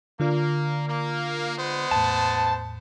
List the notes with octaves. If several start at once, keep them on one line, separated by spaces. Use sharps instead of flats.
D3 A#3 F4 D5
A#3
G#3 B3 C5
E2 A2 A5